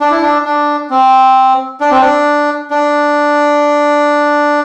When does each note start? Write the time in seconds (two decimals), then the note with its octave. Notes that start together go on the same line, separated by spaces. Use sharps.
0.01 D4
0.11 E4
0.22 D4
0.45 D4
0.90 C4
1.81 D4
1.91 C4
2.01 D4
2.71 D4